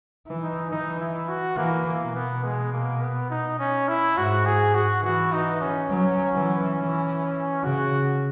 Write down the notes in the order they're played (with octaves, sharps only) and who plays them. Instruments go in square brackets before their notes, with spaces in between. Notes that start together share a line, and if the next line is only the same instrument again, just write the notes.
[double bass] E3
[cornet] D#4
[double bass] E3 [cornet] D#4
[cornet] E4
F#4
[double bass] E3 [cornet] A#3
[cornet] A#3
[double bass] B2
[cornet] B3
G#3
A#3
B3
D#4
C#4
E4
[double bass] G#2 [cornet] F#4
[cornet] G#4
F#4
[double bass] E3 [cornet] F#4
[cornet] D#4
C#4
[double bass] F#3
E3
E3
[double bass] C#3 [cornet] F#4